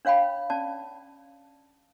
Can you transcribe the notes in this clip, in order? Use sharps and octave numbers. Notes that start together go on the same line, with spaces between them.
D4 C#5 F5 G5 B5
C#4 D5 A5